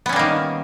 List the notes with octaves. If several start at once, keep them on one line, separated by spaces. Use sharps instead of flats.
D#3 G3 A#3 B3 C#4